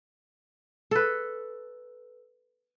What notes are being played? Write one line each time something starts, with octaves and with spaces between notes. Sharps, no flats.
A4 B4